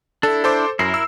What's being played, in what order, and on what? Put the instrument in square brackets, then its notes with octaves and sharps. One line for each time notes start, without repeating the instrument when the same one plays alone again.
[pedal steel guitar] D4 E4 [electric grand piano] A4
[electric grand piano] A4 C5 D6
[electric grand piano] F#2 C7 [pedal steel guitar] E4 A#4
[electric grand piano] E6